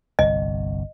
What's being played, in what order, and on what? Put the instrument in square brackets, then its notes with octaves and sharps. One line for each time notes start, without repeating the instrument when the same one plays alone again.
[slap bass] G1 C2 [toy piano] D#5